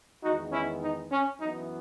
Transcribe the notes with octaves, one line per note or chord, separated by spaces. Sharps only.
E2 D#3 G#3 B3 D#4 F#4
C#4 E4
D#4
C#4
F#2 E3 B3 D#4